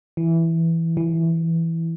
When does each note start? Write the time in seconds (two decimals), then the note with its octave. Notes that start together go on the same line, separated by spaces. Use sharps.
0.17 E3
0.97 E3